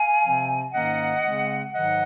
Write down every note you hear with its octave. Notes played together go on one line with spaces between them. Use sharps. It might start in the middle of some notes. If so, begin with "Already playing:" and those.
Already playing: F5 G#5
C3 F3 C4
G#2 D#3 A#3 C#4 D#5 F#5
C#3 G#3 C4
G#2 D#3 F#3 D#5 F#5